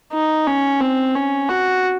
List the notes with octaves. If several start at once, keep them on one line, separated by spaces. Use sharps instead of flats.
D#4
C#4
C4
C#4
F#4